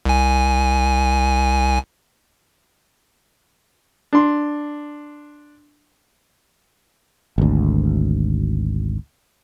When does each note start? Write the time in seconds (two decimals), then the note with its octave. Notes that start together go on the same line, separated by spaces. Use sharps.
0.05 C2 G#5
4.13 D4 C6
7.38 G#1 D2